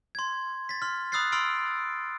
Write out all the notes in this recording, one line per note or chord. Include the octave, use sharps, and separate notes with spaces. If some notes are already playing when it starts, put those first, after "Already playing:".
C6 G#6
A6 B6
C6 F6
B5 D#6 E6 F#6 A6 C7
B5 C6 E6 F6 A6 D7